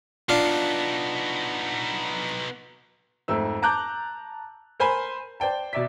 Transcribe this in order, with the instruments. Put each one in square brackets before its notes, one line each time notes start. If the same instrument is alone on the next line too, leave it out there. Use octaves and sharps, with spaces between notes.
[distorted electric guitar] B3 D#4 [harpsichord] D4 F4
[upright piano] F2 G#2 A3 E6
A5 A#5 D6 F#6 G6
A#4 C5 G#5 B5 C6
C5 D5 G5 A5
B2 D5 E5 D6 B6